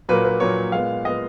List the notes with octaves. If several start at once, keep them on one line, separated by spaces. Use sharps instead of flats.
A#2 F#3 A#3 B4
B4
A#2 F#3 A#3 C#5
A#2 G#3 B3 F5
A#2 G#3 B3 D#5